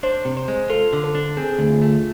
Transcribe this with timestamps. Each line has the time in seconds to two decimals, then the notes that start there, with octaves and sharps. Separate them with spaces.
0.03 D4 C5
0.25 C3
0.37 C5
0.48 G#3
0.70 F4 A4
0.93 D3
1.04 A4
1.15 D4
1.37 C4 G#4
1.59 D2
1.70 F4
1.82 A3